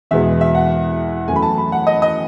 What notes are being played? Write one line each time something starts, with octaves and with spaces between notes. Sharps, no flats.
E2 B2 G#3 B3 E5
E5
F#5
F#2 E3 A3 G#5
B5
A5
B5
F#5
D#5
D#5